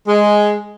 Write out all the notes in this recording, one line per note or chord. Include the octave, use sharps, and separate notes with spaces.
G#3